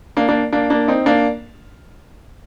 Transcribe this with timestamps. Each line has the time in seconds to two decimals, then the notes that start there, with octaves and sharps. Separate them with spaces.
0.17 A#3 D4
0.29 A#3 D4
0.52 A#3 D4
0.70 A#3 D4
0.88 C4 D#4
1.06 A#3 D4